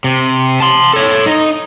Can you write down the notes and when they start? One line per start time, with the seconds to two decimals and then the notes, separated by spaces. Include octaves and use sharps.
0.04 C3
0.60 A5 C6
0.94 A4 C#5
1.26 D#4